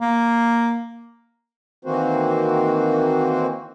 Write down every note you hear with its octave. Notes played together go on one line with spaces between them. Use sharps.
A#3
D#3 E3 A#3 C4 F#4 C5